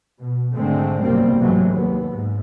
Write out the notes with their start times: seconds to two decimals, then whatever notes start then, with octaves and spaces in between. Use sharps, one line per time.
0.19 B2
0.55 G#1 D3 G#3 A3 C4
1.01 G1 C2 F#2 G3 A#3 C4
1.38 G#2 C3 E3 F#3 G#3 A3
1.70 D#2 B3
2.08 G#2